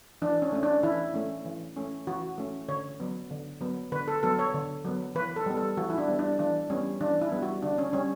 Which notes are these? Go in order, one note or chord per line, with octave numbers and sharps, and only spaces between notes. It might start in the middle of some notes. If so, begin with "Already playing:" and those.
E3 D4
C#4
A3 C#4
D4
E3 E4
A3 C#4
E3
A3 C#4
E3 F#4
A3 C#4
D3 C#5
F#3 B3
D3
F#3 B3
D3 B4
A4
F#3 B3 A4
C#5
D3
F#3 B3
E3 B4
A4
G3 B3
A4
E3 F#4
E4
D4
G3 B3
D4
E3 D4
G3 B3 C#4
E3 D4
E4
G3 B3
F#4
D3 D4
C#4
G3 C#4